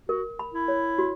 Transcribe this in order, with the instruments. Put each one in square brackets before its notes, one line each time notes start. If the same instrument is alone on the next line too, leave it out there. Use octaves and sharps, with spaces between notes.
[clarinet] F#4 [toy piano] A#4
[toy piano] B5
[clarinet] E4
[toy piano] C#5
F#4